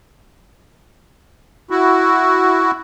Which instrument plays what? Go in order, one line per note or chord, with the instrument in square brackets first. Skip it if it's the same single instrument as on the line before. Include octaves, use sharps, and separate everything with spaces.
[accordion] E4 F#4